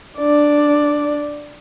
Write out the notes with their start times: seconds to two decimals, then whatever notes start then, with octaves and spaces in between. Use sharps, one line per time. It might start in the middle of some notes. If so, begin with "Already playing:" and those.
0.19 D4 D5